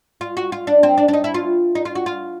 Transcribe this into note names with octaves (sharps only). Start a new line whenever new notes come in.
F4
F#4
F4
D4
C4
D4
D4
D#4
E4
F4
D#4
F4
F#4
F4